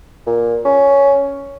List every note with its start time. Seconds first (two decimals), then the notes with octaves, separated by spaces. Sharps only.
0.27 A#2
0.65 C#4